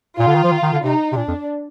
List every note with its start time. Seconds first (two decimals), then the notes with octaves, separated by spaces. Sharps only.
0.18 A#2 F4
0.27 D3
0.35 D#3
0.44 F3
0.52 D#3
0.62 D#3
0.72 D3
0.84 C3 D#4
1.12 C3
1.17 A#2 D4
1.28 F2